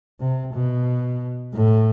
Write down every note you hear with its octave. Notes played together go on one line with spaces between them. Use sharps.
C3
B2
A2